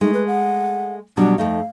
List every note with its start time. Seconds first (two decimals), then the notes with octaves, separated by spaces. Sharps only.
0.01 G#3 A3 D#4
0.14 B4
0.27 F#5
1.17 B2 F#3 G3 D4
1.38 F2 A3 D#4 F5